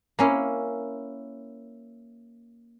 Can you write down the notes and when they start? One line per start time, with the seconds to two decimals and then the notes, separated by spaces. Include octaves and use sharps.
0.19 A#3 C#4 E4